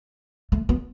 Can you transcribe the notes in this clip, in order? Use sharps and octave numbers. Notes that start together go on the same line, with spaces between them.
A3
B3